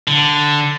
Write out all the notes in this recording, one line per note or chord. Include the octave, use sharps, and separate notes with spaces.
D3